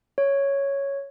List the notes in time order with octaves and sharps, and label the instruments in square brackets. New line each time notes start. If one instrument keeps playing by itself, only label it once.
[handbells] C#5